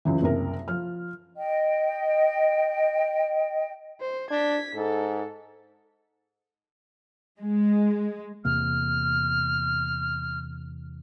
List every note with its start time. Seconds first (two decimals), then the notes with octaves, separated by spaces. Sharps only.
0.05 C#2 F#2 E3
0.22 F#1 C2 A#4
0.68 F3 F6
1.37 D#5 G5
4.01 C5
4.31 D4 G#6 B6
4.75 G#2 A4
7.39 G#3
8.45 E2 C3 A#3 F6